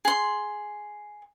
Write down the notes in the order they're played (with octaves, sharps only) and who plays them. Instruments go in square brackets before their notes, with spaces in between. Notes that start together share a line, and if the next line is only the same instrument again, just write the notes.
[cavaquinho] G#4 C6